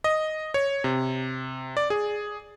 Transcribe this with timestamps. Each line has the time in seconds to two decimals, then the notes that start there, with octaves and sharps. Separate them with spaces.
0.04 D#5
0.54 C#5
0.84 C3
1.77 D5
1.90 G#4